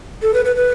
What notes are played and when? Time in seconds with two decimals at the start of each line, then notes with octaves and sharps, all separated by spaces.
0.22 A4
0.34 B4
0.45 B4
0.56 B4